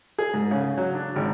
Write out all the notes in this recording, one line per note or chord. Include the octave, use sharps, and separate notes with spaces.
G#4
G#2
C#3
F#3
D4
G#1